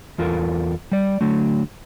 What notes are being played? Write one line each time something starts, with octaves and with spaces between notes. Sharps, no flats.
E2 F4 A4 A#4
G3 D5
D3 F#3 A3